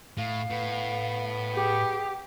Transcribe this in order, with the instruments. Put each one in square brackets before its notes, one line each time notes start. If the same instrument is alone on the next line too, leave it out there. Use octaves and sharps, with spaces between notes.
[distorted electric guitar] A2 [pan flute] F5
[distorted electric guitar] A2 [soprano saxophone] B3
[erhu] G4 [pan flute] G#4